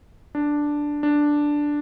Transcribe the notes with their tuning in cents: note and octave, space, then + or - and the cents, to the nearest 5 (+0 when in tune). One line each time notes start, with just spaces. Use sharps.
D4 +0
D4 +0